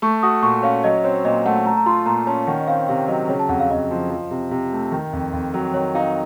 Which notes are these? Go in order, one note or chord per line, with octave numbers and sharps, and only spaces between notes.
A3 C#6
F#4 D#6
A#2 C#6
C#4 F5
F#3 D#5
C4 C#5
A#2 D#5
A3 F#5
A3 A#5
A#5
F4 C6
A#2 A#5
C#4 A5
D#3 F#5
D#5
C4 F5
C3 F5
F#3 D#5
C#3 C#5
A5
F2 F#5
F5
F2 D#5
F3
F3
C3
C3
A3
D#3
F2
F2
F#3
D#3 C#5
D#4 F5